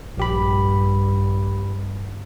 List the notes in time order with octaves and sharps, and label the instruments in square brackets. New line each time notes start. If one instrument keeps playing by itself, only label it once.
[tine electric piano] A#1 G4 B5 [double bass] G2